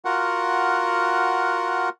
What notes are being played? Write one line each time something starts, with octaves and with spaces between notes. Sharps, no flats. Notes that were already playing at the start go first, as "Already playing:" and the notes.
F4 F#4 A#4 F#5